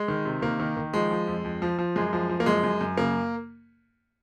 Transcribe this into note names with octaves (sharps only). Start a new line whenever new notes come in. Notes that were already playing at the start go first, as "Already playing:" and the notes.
Already playing: G#3
D#3
C3
D#3 A#3
D#3
D#3
F3 G#3
F3
F2
F2
F3
F3
F#2 G#3
F3
F3
A#3
F#2 G#3
F#2
F#2
C#3 A#3